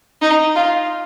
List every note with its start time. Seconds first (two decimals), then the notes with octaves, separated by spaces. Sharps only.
0.22 D#4
0.55 F4